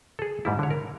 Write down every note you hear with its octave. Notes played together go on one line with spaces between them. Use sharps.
G#4 A4
G#2 G3 E4
D3 C#5
A#4